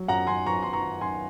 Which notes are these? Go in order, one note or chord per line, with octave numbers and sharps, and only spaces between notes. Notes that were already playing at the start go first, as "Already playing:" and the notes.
Already playing: F#3
F#2 F#5 A#5
F#2 G#5 C6
F#2 A#5 C#6
F#2 C6
A#5 C#6
D#3
F#2 G#5 C6